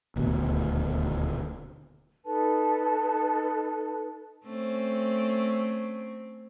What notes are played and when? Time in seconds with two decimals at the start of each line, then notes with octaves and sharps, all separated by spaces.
0.16 D#1 D2 B2
2.25 D#4 A4 B4 A5
4.45 A3 C4 C#4